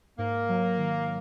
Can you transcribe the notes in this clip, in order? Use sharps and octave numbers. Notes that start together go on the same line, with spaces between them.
G#2 A#3
F#3
D#3